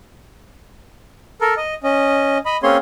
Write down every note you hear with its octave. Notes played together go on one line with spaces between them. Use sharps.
A4 A#4
D#5
C#4 D#5
D#5 B5
A#3 C4 C#4 G#4 C#5 C6